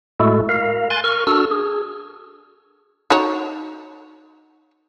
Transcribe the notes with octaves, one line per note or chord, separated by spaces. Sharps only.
A2 G#3 A3 E4 F#4 A4
A#4 F5
G#5 C6 F#6 A6
A#4 C#6 F6
D4 F#4 A4 E6 F6
G#4
D#4 F#4 C#5